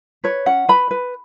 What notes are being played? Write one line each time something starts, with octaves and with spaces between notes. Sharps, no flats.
B4 C#5
C#4 F#5
B4 B5
B4